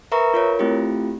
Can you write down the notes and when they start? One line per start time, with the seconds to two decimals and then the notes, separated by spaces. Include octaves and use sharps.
0.12 A#4 B4 E5 A#5 C#6
0.34 F4 A#4 C#5
0.59 A3 C4 E4 F4 G4